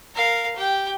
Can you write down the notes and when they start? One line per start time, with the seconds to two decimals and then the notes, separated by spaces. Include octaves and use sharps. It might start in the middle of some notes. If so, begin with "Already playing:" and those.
0.15 A#4 F5
0.56 G4 G5